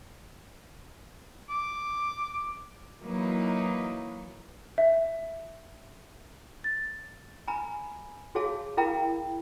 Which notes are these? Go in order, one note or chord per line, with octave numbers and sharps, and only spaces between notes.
D6
E3 F#3 A#3 D#4 B4
E5
A6
G#5 A#5 B5
F#4 G#4 C#5 F5 A5
E4 A#4 F5 G5 A#5 B5